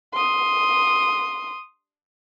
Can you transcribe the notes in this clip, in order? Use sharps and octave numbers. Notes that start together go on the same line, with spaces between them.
C6 D#6